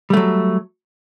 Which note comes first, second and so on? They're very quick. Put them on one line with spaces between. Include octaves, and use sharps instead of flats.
G3 A3 F#3